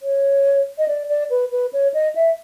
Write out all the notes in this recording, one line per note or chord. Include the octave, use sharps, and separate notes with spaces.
C#5
D#5
D5
D5
B4
B4
C#5
D#5
E5